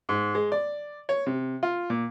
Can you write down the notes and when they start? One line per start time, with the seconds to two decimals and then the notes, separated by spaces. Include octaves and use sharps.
0.09 G#2
0.35 G#3
0.52 D5
1.09 C#5
1.27 C3
1.63 F4
1.90 A#2